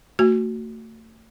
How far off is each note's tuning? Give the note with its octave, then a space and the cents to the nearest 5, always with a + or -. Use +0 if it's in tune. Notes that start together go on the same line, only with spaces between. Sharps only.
A3 +35 F#4 +0